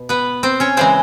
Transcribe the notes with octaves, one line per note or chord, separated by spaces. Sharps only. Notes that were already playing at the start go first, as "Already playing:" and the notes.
Already playing: B2
B3 B4
C4 C5
C#4 C#5
C#3 E3 G#3 C4 C5